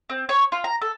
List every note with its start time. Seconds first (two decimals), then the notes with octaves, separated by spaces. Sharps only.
0.10 C4
0.29 C#5
0.52 F4
0.64 A#5
0.82 A4